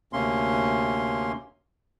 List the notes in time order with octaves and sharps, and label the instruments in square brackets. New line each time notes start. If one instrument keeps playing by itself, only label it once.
[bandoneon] D2 C3 A#3 C#4 C6